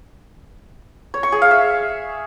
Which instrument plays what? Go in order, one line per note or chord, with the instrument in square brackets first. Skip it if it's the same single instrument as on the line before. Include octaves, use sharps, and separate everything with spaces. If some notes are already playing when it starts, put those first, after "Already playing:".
[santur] C#5
C#6
G#4
F5
E5